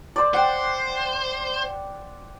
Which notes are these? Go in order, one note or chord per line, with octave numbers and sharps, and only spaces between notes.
C5 D5
C5 F#5 G5